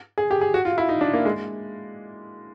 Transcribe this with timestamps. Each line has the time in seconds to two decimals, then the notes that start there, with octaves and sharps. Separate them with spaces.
0.18 G#4
0.31 G4
0.41 G#4
0.54 F#4
0.65 F4
0.78 E4
0.89 D#4
1.01 D4
1.13 A#3
1.25 G#3